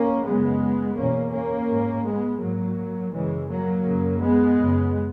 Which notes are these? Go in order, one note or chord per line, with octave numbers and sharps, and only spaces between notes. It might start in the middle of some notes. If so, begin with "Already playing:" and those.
Already playing: A#3 C#4
F#2 C#3 G#3 B3
E2 B2 A#3 C#4
A#3 C#4
G#2
G#3 B3
G#2 F#3 A#3
F#2 C#3 E3 G#3
F#3 A#3
F#2 C#3
G#3 B3
F#2 C#3